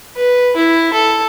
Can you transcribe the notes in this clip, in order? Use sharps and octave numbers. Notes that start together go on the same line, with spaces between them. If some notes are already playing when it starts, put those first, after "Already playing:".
B4
E4
A4